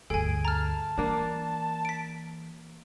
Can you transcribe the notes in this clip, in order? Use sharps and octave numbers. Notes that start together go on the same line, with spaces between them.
D2 G2 G#4 A4 G#5 D7
A5 A#5 F6
E3 A#3 D4
B6 D7